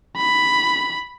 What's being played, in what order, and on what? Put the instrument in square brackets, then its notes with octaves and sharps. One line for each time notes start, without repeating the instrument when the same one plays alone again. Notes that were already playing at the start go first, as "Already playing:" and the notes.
[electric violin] B5